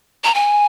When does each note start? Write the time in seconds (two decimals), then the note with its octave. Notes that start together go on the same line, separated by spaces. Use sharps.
0.24 A#5
0.35 G#5